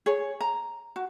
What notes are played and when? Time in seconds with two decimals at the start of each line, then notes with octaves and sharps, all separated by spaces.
0.06 G#4 C#5
0.41 A#5
0.96 F#4